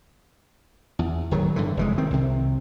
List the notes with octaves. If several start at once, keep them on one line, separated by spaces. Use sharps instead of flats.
E2
D1 D#3 F#3
G2 D3 E3
F1 E3 G#3
D#3 C4
C2 C3